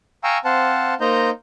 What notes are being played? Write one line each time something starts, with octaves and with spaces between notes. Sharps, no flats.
F5 G5 G#5 A#5 C#6 E6
C4 C5 F5 F#5 A5
A#3 D#4 C5 D#5 A#5 G6